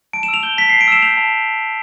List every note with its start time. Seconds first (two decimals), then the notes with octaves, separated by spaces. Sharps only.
0.13 A5 D7
0.23 E7
0.28 E6
0.34 F7
0.43 G6 G7
0.57 A5 B6
0.69 A5 C7
0.81 D7
0.88 E6 E7
1.02 G6 F7
1.17 A5